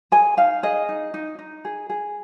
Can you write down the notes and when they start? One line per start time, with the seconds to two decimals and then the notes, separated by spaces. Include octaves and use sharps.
0.12 G#4 G#5
0.37 D#4 F5
0.63 G#4 D#5
0.89 D#4
1.14 D#4
1.39 D#4
1.65 G#4
1.90 G#4